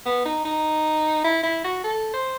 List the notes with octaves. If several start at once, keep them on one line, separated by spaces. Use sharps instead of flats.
B3
D#4
D#4
E4
E4
F#4
A4
C5